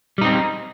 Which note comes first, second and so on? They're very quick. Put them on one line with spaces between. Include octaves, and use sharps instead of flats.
G3 D#4 C4